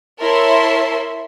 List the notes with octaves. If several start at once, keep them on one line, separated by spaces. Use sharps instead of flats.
E4 A#4 C#5 E5 A5 C6